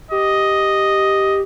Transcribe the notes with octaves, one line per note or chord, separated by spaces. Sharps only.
G4 D#5